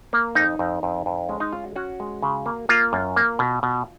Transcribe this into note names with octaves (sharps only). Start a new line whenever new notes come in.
A#3
F2 D#4
F2
F2
F2
G#3 C#4
D#4
C#4 F4
F#4
C#4 F#4
G#3
C#3
A#3
A#3 F4
F#2
A#3
B2
B2